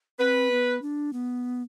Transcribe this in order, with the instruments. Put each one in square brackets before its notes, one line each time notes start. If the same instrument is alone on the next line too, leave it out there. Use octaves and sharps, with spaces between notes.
[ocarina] C4 [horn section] B4
[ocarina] B3
D4
B3